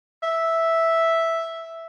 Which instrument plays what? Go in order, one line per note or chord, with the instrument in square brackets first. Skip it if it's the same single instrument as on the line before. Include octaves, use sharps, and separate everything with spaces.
[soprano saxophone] E5